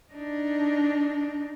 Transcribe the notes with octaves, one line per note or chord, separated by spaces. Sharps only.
D4 D#4